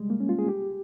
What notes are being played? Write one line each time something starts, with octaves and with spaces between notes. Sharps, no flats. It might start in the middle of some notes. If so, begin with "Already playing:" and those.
Already playing: G3 G#3
A#3
C#4
F4
G#4
G4